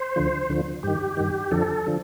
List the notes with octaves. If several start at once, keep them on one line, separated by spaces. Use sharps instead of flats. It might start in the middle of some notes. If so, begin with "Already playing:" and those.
Already playing: C5
D2 D3 F3
D2 D3 F3
G2 D#3 G4
G2 D#3
F2 D3 F3 A4
D3 F3